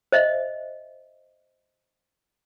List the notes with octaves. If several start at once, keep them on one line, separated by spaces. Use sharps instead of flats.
C5 D#5 E5